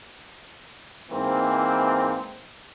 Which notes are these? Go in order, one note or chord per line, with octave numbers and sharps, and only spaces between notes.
G#2 E3 A#3 C4